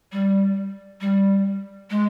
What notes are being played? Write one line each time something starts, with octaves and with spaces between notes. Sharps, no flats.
G3
G3
G#3